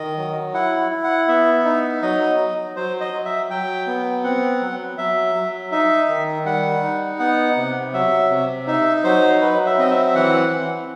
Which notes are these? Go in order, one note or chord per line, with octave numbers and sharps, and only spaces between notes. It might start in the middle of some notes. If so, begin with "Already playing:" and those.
Already playing: D#3 D#5
F#3
E4 F#5
E4
F#5
B3 E5
D#4
F#3 D#5
F#3
F#3 C5
D#5
F#3
E5
F#3 G5
B3
C4 F#5
F#3
F#3 E5
F#3
D#4 E5
D#3
G3 F#5
D#4
B3 F#5
C3
F#3 E5
C3
D#4 E5
F#3 C5
F#3 B4
E5
C4 D#5
E5
E5
E3 F#5
E3